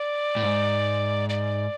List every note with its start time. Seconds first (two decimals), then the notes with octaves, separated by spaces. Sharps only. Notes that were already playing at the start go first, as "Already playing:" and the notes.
Already playing: D5
0.36 A2
0.43 G#2
1.30 D5